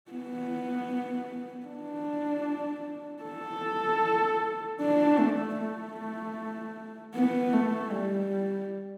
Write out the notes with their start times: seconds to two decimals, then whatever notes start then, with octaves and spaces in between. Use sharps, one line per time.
0.11 B3
1.67 D4
3.23 A4
4.80 D4
5.18 A3
5.59 A3
7.15 B3
7.53 A3
7.92 G3